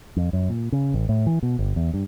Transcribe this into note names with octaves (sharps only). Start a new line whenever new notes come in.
F2
F#2
A#2
C#3
A1
A2
E3
B2
G1
E2
G2